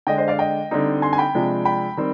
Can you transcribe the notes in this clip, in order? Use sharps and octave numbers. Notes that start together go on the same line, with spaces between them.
D3 G#3 D4 D#5 G5
C5 D#5
D5 F5
D#5 G5
D3 G3 C4 D#4
G#5 C6
G#5
G5 B5
C3 F3 G#3 D4
G5 B5
D#3 G3 C4